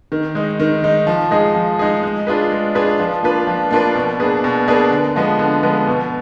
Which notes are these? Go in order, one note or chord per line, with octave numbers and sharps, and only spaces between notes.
D#3
G#3 D#4
D#3
G#3 D#4
F3
G#3 D#4 G#4
F3
G#3 D#4 G#4
G#3
D4 F4 G#4 B4
G#3
D4 F4 G#4 B4
F3
A#3 D4 F4 B4
F3
A#3 D4 F4 B4
B2
A#3 D4 G#4 B4
B2
A#3 D4 G#4 B4
D3
F3 G#3 B3
D3
F3 G#3 B3
B2